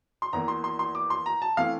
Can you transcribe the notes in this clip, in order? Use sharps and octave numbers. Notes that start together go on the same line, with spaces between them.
C6
E2 E3 A#3 A#5
C6
C6
C6
D6
C6
A#5
A5
E3 A3 C4 F5